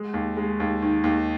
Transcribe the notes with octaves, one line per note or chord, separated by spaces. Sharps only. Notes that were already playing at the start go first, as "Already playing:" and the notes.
Already playing: G#3
D#2
G#3
D#2
D#3
D#2